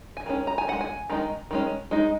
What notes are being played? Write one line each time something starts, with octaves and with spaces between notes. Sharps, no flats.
G#5
D#3 G#3 C#4
A#5
G#5
G#3 D#4 F#5
G#5
D#3 G#3 D#4
D#3 G#3 C#4
G#3 D#4